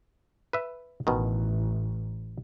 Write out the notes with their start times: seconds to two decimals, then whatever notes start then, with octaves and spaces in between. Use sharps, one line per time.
0.53 B4 E5
1.07 A1 B2 D#3